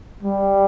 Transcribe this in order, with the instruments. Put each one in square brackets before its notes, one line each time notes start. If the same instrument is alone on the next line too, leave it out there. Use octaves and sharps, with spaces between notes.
[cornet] G3